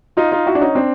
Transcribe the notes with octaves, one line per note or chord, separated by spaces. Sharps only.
D#4 F4
D#4 F4
E4 F#4
D4
C#4 D#4
C4 D4